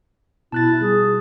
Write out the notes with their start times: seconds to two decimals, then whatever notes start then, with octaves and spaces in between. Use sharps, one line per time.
0.52 B2 B3 E4 A5 F#6 A6
0.81 G3 F4 G#4